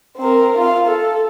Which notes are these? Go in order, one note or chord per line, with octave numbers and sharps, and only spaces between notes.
C4 A#4
F4 F5
A4